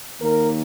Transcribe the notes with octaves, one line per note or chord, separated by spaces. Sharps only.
D#2 D#3 A#3 A#4